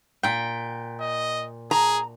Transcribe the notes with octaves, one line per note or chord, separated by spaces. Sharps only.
A#2 G5
D#5
G#4 A#5